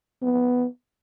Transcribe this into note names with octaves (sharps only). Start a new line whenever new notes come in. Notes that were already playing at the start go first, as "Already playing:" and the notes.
B3